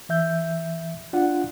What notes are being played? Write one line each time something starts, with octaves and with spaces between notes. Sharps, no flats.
E3 E5 G6
D4 F4 F#5